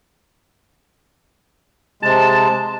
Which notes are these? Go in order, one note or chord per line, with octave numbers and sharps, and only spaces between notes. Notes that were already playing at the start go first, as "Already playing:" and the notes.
C3 G#3 C4 A5